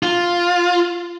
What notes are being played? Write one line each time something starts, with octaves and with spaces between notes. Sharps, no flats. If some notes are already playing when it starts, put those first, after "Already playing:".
F4